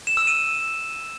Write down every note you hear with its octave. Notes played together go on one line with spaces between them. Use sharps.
E7
E6
D#7